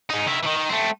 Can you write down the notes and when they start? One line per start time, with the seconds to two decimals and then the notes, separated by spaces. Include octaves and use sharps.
0.10 G#2 D#4
0.27 D#3 E4
0.44 D#3 E3
0.57 D#3
0.69 A3 C4